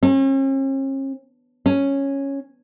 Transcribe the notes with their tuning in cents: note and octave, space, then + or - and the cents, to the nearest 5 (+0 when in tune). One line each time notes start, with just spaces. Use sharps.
C#4 -45
C#4 -5